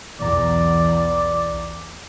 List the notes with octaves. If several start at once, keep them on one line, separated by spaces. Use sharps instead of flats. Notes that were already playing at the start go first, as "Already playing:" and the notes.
B1 E2 D5 A#5